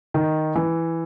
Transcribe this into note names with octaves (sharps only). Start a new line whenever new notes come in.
D#3
E3